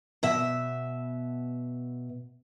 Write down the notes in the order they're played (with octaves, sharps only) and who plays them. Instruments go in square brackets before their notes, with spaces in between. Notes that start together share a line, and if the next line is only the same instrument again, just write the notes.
[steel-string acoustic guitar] B2 E5